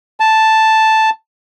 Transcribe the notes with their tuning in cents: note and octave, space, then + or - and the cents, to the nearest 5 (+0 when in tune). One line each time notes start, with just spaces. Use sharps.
A5 +0